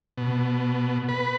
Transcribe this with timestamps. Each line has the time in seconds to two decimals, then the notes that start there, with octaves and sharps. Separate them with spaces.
0.18 B2
1.09 B4